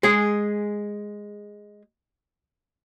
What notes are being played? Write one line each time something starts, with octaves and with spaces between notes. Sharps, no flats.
G#3 G#4